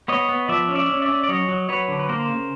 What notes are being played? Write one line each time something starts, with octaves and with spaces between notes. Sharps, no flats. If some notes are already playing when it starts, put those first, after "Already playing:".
B3 C#5 D#5
B3
F3 D5 E5
C#4
D5 E5
C#4
D5 E5
C#4
D5
F#3 C#5 D#5
F#3
F#3 B4 C#5
D3
B4
A#3 A#4 C5
C#3